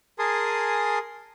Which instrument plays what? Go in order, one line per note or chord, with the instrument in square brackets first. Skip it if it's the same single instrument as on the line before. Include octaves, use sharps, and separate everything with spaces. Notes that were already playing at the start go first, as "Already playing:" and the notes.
[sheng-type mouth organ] G#4 A#4 G#5 A5 C6 D#6